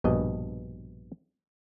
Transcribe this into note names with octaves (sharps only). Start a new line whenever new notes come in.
A#1 G2 B2 D#5